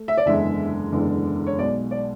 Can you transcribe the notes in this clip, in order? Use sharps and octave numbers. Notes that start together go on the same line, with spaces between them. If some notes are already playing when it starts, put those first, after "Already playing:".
Already playing: A3
E5
D5
F#1 E2 D3 G#3 E5
F#1 E2 D3 G#3
C#5
B1 B2 G#3 D5
D5